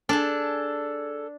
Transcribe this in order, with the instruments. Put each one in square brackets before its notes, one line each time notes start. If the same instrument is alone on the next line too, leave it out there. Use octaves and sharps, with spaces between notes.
[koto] D4 [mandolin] G#4 A4